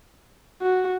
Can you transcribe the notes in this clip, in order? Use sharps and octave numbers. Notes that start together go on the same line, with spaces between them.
F#4